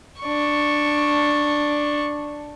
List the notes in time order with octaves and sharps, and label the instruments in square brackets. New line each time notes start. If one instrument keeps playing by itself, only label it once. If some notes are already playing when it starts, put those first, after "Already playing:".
[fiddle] D4 C#6